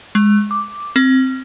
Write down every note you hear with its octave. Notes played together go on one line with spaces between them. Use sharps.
G#3
D6
C4